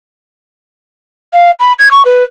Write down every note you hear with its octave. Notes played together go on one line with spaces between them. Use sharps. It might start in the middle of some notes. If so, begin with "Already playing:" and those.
F5
B5
G#6
C#6
B4